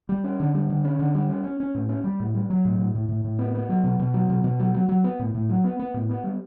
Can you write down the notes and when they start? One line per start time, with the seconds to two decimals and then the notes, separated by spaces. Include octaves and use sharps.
0.09 G3
0.24 C#4
0.40 D3
0.54 G3
0.69 D3
0.85 C#4
0.99 D3
1.15 G3
1.30 C#4
1.44 C#4
1.60 C#4
1.75 A2
1.89 C#4
2.04 G3
2.20 A2
2.34 G3
2.50 F#3
2.65 A2
2.79 A2
2.95 A2
3.09 A2
3.24 A2
3.39 B3
3.54 B3
3.69 F#3
3.84 B2
3.99 B2
4.14 F#3
4.30 B2
4.44 B2
4.59 F#3
4.74 F#3
4.89 F#3
5.04 B3
5.19 A2
5.35 A2
5.49 F#3
5.64 B3
5.79 B3
5.94 A2
6.09 B3
6.24 G3